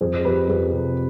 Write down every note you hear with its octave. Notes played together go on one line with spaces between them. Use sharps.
F2 G#4 C5
F2 G4 B4
F2 G#4
C3